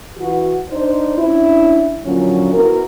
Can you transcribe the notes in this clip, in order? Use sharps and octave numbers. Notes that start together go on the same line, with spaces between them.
E3 F#4
D4 D#4 C5
C#4 D4 E4
A#2 D3 F3 F#3 C#4
B3 E4 F#4 A#4